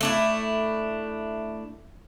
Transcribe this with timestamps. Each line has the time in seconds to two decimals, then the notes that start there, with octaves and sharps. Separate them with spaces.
0.01 A3 D4 E4